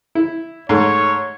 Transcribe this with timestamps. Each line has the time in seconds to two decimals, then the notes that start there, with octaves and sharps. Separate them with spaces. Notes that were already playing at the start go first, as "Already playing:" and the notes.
0.15 E4
0.69 G#2 A3 C#5